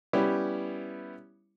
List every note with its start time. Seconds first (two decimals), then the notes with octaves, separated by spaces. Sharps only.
0.13 G3 B3 C#4 E4 G4